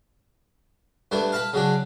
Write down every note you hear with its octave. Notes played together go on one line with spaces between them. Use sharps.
G2 A3 B3 D4
F5 A5 B5
C#3 F#3 D4